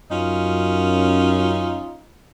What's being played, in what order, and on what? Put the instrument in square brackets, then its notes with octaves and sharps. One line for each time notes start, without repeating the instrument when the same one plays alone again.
[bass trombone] F#2 [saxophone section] C#4 D#4 F4